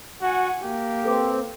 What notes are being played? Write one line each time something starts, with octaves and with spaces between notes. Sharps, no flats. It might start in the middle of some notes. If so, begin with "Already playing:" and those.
F#4 F#5 G#5
A#3 G4
C4 A4 B4 D6